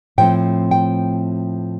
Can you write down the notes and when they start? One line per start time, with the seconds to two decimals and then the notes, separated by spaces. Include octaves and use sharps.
0.18 A2 F3 A3 C4 G5
0.71 G5